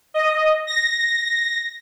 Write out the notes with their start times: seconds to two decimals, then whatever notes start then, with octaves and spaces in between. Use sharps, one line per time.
0.14 D#5
0.67 A#6